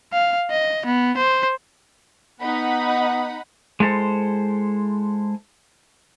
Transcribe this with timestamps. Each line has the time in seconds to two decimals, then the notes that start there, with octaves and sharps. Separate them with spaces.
0.13 F5
0.50 D#5
0.86 B3
1.17 C5
2.40 B3 D#4 F#5 B5
3.80 G#3 E4 A4 C5